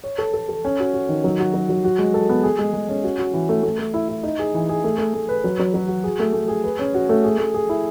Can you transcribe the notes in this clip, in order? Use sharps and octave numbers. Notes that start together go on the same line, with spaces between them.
C#5
A4
A4
A4
C#4
F#4
F#4
D#3
F#3
F#4
F#3
F#3
F#4
G#3
A4
B3
G#4
G#3
G#3
C#4
F#4
F#4
E3
A3
A3
A3
E4
E4
D#4
G#4
E3
G#4
A3
A3
A3
B4
F#3
F#3
F#3
F#4
G#4
A3
A3
G#4
B4
C#4
F#4
A3
G#4
A3
G#4
E4